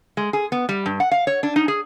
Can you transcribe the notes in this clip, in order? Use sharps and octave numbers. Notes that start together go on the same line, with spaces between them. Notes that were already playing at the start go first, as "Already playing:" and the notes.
G#3
G#4
B3
G3
G2
F#5
F5
C#5
D4
D#4
G#4